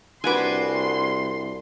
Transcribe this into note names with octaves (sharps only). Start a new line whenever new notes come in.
C2 D4 F#4 B4 G#5 C6 D6